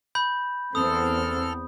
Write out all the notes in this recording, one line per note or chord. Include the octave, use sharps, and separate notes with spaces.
B5 G6
E2 C4 A4 D#6 F6